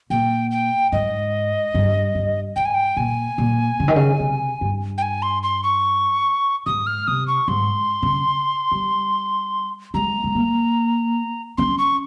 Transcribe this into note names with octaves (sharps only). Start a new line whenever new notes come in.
A#2 G5
G5
G#2 D#5
G2
G2
G#2 G5
G#5
G5
A#2 G#5
A#2
C#3
D#3
C#3
C3
G2
G5
G#5
C6
C6
C#6
G#2 D#6
F6
C3 D#6
C#6
G#2 C6
C#3
G3
G#3 A#5
G#3
A#3
C#4 C6
C#6